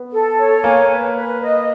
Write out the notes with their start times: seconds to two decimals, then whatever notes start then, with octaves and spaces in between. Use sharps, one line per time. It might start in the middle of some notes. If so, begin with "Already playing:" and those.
Already playing: B3
0.12 A4
0.37 C#5
0.63 A#3 G#5
0.90 B4
1.16 B4
1.42 D#5